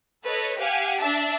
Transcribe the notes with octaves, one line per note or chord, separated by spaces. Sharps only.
A4 B4 C#5 D#5
G4 F5 F#5 G#5
D4 D5 E5 A5